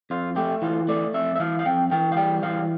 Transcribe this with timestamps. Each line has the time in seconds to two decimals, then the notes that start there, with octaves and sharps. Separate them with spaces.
0.10 F2 F4
0.36 A3 G4
0.62 E3 F4
0.88 A3 D5
1.14 F2 E5
1.36 E5
1.40 E3 F5
1.59 F5
1.65 F2 G5
1.91 E3 G5
2.12 F5
2.17 G3 G5
2.43 E3 F5